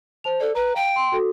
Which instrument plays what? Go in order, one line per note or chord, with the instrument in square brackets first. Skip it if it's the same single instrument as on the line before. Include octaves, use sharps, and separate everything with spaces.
[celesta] C5 A5 F7
[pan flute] A4 [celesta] D5
[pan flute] B4 [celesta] A#5
[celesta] F5 [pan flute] G5
[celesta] C6
F#4 A4